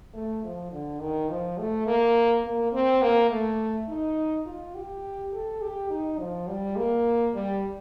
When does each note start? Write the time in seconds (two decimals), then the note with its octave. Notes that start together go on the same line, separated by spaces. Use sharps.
0.14 A3
0.43 F3
0.72 D3
1.00 D#3
1.29 F3
1.58 A3
1.86 A#3
2.44 A#3
2.73 C4
3.02 A#3
3.30 A3
3.88 D#4
4.46 F4
4.75 G4
5.33 A4
5.61 G4
5.90 D#4
6.19 F3
6.47 G3
6.76 A#3
7.34 G3